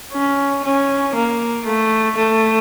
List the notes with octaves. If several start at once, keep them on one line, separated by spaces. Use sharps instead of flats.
C#4
C#4
A#3
A3
A3